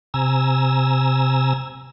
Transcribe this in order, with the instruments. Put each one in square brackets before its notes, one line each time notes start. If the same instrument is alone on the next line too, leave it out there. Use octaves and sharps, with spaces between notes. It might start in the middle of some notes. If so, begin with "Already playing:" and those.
[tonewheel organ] C3 G#5 A#5 E6